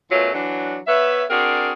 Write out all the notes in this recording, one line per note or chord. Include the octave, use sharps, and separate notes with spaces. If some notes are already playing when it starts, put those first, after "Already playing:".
F#2 B2 F#3 A3 F4
E3 F#3 D4
B3 B4 C#5 E5
C4 D4 F#4 G#4 A#4